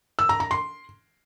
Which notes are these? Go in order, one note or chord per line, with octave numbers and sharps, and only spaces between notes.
E6
A#5
A#5
C6